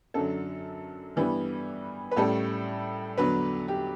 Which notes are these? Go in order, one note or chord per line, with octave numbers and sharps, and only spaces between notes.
F#2 D3 F#3 A4
G2 E3 G3 B3
B4
A2 G3 C#4 A4
E2 D3 F#3 B4
G4